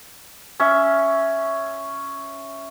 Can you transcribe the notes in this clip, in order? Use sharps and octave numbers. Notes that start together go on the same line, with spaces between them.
C#4 E5